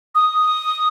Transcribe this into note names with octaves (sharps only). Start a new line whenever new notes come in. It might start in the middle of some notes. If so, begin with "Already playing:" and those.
D#6